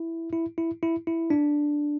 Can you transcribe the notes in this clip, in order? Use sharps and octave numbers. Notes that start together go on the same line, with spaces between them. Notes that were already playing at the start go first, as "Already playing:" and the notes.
Already playing: E4
E4
E4
E4
E4
D4